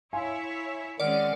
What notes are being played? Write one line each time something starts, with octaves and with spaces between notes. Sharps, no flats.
E4 C#5 E5 F5 G#5 C6
D#3 G#3 C4 C#4 D5 F#5 F6